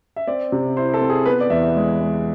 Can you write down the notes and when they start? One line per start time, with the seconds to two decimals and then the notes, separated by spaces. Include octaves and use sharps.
0.16 E5
0.27 C4 D5
0.52 C3
0.77 E4 C5
0.94 A4
1.01 C4
1.09 G#4
1.26 B3 B4
1.40 D5
1.50 E2 E5
1.63 E5
1.75 G#3
2.00 G#3